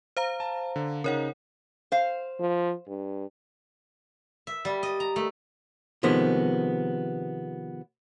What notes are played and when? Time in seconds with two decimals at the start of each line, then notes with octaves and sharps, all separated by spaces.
0.17 C5 F5 A#5
0.40 A5
0.76 D3
1.04 C#3 D#4 A#4 C#5 F#5
1.92 C5 F5
2.40 F3
2.88 G2
4.47 E5
4.65 G3
4.83 D#5
5.00 A#5
5.16 A3
6.03 C3 D#3 F3 G#3 B3